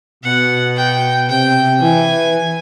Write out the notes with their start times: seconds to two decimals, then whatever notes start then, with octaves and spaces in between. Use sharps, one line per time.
0.24 B2 F#5
0.77 G5
1.29 C3 G5
1.82 E3 G#5